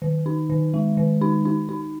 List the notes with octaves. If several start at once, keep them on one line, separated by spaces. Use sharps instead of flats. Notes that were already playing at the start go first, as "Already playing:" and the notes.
D#3
D#4
D#3
G#3
D#3
D#4
D#4
D#4